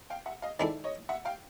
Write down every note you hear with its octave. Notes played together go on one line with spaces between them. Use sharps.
F5 G5
E5 F#5
D#5 F5
D#3 G#3 C4 E4 A4 D5 E5
C#5 D#5
E5 F#5
F5 G5